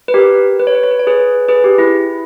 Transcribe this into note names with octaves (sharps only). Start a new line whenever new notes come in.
B4
G4 A#4
B4
C#5
B4
C#5
B4
C#5
G#4 B4
G#4 B4
G4
E4